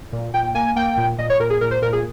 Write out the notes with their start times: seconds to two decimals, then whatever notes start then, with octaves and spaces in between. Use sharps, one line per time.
0.12 A#2
0.34 A#2 G5
0.55 A#3 G#5
0.76 A#3 G5
0.97 A#2
1.18 A#2 D#5
1.30 C#5
1.40 A#2 A#4
1.50 G#4
1.61 A#2 A#4
1.71 C5
1.82 A#2 A#4
1.93 G#4